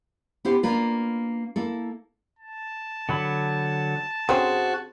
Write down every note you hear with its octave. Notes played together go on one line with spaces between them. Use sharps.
B3 E4 G4 C5
A#3 D4 F4 B4
A#3 E4 A4
A5
D3 F#3 B5
D3 C4 C#4 F#4 G#4 C5